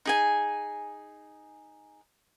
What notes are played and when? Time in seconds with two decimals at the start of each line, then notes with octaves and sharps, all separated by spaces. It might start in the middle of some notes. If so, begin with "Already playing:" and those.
0.05 D#4 G#4 G#5